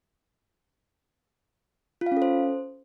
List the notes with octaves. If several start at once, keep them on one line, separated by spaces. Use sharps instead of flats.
F4
F5
C#4
A4
C5